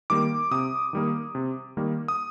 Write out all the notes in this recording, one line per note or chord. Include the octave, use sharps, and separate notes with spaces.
D#3 G3 A#3 D6
C3 D#6
D#3 G3 A#3
C3
D#3 G3 A#3
D#6